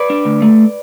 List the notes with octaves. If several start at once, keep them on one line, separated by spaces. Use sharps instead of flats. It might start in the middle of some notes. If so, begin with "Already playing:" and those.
Already playing: B4 D5
D4
D2
A3